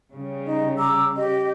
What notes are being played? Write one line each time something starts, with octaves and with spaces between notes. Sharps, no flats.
C#3 G3
D#4 D#5
A#5 D6 E6
G4 D#5